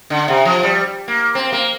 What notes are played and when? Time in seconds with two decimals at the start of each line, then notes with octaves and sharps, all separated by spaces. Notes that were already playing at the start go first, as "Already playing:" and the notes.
0.10 D3
0.28 C3
0.45 F3
0.63 G3
1.08 A#3
1.35 C4
1.53 A#3